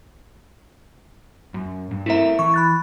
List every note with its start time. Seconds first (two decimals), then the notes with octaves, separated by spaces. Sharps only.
1.54 F#2
1.91 G2
2.06 A3 C4 E4 A#4 E5
2.39 E3 C#6
2.54 B5 F#6 A6